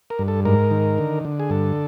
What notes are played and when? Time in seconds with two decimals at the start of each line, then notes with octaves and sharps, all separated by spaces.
0.10 A#4
0.19 G2
0.28 A4
0.45 G#2 A#4
0.71 D#3
0.98 D3
1.25 D3
1.40 G#4
1.50 G2 A4